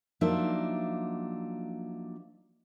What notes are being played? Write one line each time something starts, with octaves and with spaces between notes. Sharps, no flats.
F3 F#3 A#3 D4 D#4 E5